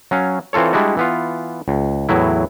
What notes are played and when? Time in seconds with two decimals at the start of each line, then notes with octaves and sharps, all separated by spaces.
0.11 F#3 C#4 F5
0.53 E3 C4 F4 A4 C#5
0.73 G3 G#3 D4 E4 F#4
0.97 E3 B3 F4
1.68 C#2
2.09 E2 A2 F#3 E4